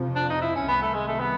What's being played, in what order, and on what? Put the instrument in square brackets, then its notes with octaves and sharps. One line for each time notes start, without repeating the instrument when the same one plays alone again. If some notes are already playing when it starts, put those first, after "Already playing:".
Already playing: [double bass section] F2 C3 F3
[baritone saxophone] D4
D#4
E4
C#4
[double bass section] C2 C3 D#3 G3 [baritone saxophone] B3
[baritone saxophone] A3
G#3
A3
B3